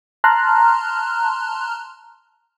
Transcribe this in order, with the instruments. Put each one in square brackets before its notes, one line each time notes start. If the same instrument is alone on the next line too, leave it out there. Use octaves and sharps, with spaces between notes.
[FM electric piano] A5 A#5 C6 F6 F#6